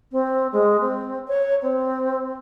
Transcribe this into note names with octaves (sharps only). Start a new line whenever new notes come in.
C4
G#3
C4
C#5
C4